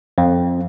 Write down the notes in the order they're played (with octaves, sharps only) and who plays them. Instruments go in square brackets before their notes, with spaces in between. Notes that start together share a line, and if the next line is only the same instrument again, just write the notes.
[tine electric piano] F2